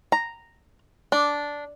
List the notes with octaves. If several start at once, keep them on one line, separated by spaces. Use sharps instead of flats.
A#5
D4